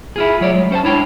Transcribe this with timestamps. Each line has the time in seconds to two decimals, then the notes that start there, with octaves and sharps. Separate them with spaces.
0.16 E4 F4 G#4
0.41 F#3 C#5 D5
0.54 F#3 G#3
0.71 C#4 C5 F#5 A5
0.83 D4 E4 C#5 G5